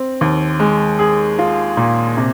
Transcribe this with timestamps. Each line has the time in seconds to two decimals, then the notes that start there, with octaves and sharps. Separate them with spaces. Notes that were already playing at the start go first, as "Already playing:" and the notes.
Already playing: C4
0.21 D#2
0.60 G#3
0.99 G#4
1.39 F4
1.77 A#2
2.17 C3